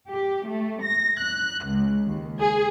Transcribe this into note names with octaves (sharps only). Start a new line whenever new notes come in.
G4
A3
A#6
F#6
C#2
D#2
G#4